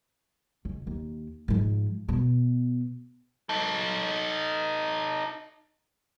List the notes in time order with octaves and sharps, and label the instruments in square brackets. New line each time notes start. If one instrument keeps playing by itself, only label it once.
[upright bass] C#2
D#2
G#2 F3
B2 B3
[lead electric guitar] D#4 A4